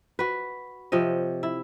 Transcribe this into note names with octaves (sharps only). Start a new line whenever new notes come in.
F#4 B4
C3 F3 C#5 D#5
E4